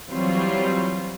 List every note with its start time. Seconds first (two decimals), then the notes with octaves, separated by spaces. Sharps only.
0.10 E3 F#3 G3 C4 F4 C#5